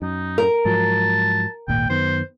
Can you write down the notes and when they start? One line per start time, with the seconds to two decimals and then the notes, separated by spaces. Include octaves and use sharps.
0.02 F#2 D#4
0.38 A#4
0.65 G#2 F3 F#3 A5
1.68 D#1 G#1 A#2 G5
1.89 F#2 D#3 B3 C5